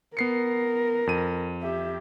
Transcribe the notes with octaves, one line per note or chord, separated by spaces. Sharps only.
B3 A#4 C7 C#7
F2 D#7
G4 E5